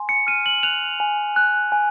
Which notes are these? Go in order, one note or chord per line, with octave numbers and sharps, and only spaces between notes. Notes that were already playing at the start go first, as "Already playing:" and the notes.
Already playing: G#5 C6
C#7
F6 D#7
F#7
F#6 F7
G#5
F#6
G#5